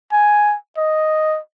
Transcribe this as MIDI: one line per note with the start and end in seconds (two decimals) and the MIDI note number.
0.12 0.55 80
0.77 1.39 75